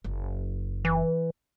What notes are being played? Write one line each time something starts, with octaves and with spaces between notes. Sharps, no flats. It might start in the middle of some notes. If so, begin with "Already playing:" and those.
F#1
E3